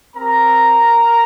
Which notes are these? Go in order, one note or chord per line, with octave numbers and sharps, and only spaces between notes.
C4 G4 A#4 A#5